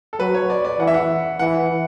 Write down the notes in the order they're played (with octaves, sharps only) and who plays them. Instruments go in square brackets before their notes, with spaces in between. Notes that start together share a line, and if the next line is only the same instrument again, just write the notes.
[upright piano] A4
[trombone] F#3 [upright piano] B4
[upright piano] C#5
D5
D5
[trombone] E3 [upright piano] F#5
[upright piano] E5
F#5
[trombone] E3 [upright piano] F#5